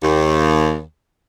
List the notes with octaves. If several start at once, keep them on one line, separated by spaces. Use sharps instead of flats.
D#2